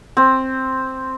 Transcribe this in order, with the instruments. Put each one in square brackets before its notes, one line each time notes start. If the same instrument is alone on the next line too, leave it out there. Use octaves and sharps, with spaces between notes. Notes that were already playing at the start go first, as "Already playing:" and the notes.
[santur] C4